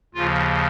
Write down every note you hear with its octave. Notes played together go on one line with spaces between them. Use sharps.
D#2 C#3 F3 F4